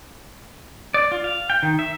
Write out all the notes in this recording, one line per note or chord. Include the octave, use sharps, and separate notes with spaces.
D5
F4
F5
G5
D#3
E5